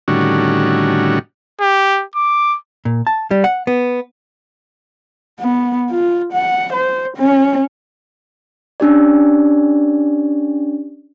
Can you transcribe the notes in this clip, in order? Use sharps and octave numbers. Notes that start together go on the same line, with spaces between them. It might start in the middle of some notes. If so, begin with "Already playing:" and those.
A2 D3 D#3 G3 C#4 F#4
G4
D6
A#2
A5
G3
F#5
B3
B3
F4
F#5
C5
C#4
C#4 D4 G4 D5